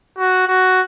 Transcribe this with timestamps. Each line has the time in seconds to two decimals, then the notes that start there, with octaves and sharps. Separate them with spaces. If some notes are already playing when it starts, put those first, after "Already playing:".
0.17 F#4
0.48 F#4